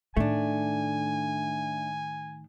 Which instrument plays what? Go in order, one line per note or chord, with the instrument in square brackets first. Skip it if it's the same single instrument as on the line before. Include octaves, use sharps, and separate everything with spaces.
[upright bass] A2 D#3 [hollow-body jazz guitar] A3 D4 [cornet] G#5